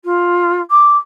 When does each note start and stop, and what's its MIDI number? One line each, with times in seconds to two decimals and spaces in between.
0.04 0.60 65
0.70 0.96 86